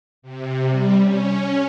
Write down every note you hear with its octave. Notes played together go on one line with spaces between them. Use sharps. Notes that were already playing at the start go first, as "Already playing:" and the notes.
C3
G3
C#4